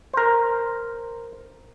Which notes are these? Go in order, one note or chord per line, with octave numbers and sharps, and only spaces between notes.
A#4 C5